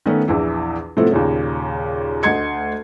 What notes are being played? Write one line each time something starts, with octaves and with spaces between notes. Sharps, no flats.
D#3 A3 B3 C#4
A#1 E2 E3
A2 C3 F3 A3 B3
D#2 A#2 C#3
D2 D#5 C6 G#6 C#7